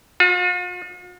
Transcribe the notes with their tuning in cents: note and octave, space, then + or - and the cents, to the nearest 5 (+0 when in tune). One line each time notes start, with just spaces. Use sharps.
F4 +45